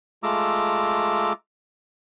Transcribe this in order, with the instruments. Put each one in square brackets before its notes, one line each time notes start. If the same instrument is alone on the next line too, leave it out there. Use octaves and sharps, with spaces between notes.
[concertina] G#3 A3 F4 A#5 D6 E6